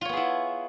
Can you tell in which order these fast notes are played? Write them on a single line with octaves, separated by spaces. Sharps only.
F4 C#5 B3 G#4 E4